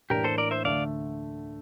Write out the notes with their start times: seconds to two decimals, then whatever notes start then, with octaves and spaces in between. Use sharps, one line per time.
0.10 A2 E3 A#3 D4 G4 A#4
0.24 A4 C5
0.38 A#4 D5
0.51 C5 E5
0.65 D2 D3 A3 D5 F5